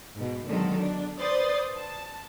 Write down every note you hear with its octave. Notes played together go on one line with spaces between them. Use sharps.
G#2 B2
B2 D3 D#3 F#3 G#3 A4
D4
B4 C5 D5 C6 D#6 A6
A5